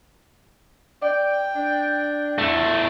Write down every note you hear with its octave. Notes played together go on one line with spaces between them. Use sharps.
D5 G5
D4
E2 A3